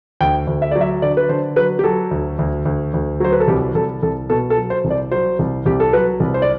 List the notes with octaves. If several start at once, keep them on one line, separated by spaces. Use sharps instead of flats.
D2 G5
D2
E5
F#3 D5
E5
D3 D5
B4
D3 C5
F#3 B4
G4
F#3 A4
D2
D2
D2
D2
F#3 C5
B4
A4
C2 G4
C2 A4
C2 A4
B2 A4
A4
F#3
C5
C2
D5
F#3 C5
C2
C2 G4
A4
F#3 B4
C2
C5
D5